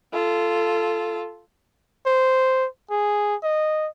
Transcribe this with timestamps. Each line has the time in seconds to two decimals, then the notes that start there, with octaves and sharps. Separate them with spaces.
0.13 F4 A4
2.06 C5
2.90 G#4
3.43 D#5